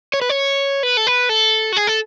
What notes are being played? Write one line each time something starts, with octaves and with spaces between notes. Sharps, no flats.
C#5
B4
C#5
B4
A4
B4
A4
F#4
G#4
A4